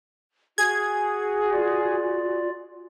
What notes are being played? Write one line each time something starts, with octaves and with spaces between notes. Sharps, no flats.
F#4 G#4 G#6
F4 D5